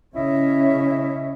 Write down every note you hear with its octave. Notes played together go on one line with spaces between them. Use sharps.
C#3 C#4 E4 D#5 E5